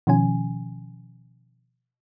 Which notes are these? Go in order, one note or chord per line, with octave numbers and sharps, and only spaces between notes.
B2 D#3 F3 C#4 G#5